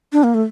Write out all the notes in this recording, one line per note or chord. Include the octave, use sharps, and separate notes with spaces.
D4
A#3
A3